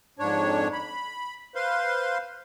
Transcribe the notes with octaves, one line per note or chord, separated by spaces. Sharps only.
F2 G#2 D4 C#5
B5
B4 C5 F5 C6